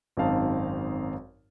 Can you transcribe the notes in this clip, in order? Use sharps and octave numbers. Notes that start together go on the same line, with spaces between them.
G#1 F#2 C4 D#4 F5 A5